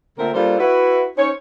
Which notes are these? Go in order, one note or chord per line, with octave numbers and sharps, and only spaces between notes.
A#2 D3 A3 C4 A#4
G3 A#3 D4 F4 A4 C5
E4 F#4 B4
C#4 D#4 C5 C#5